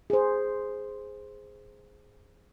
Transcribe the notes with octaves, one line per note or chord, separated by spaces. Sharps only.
G#4 C5